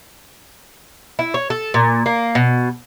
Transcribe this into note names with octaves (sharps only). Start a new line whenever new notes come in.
E4
C#5
A4
A#2
A#3
B2